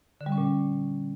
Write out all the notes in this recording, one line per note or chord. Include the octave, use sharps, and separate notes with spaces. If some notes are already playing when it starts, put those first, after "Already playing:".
D3
G3
C#4
A#2